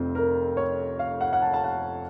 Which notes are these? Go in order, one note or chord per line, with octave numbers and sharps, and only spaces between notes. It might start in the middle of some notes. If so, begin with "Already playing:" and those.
Already playing: F1 F2 C4
A#4
C#5
F5
F#5
F#5
A5
A5
F#5